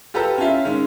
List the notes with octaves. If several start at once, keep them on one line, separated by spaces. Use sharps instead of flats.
F4 G4 A4 B4 A#5 E6
C#4 E4 F4 E5
D#3 G#3 C#4